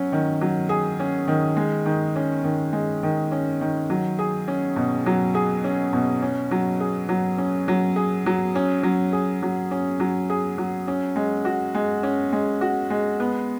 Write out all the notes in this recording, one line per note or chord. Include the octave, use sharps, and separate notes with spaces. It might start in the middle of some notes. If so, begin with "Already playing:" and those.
Already playing: F#3 C#4
D#3
F#3
G#4
C#4
D#3
G#3
D#3
C#4
D#3
G#3
D#3
C#4
D#3
F#3
G#4
C#4
B2
F#3
G#4
C#4
B2
C#4
F#3
G#4
F#3
C#4
F#3
G#4
F#3
C#4
F#3
G#4
F#3
C#4
F#3
G#4
F#3
C#4
G#3
F#4
G#3
C#4
G#3
F#4
G#3
B3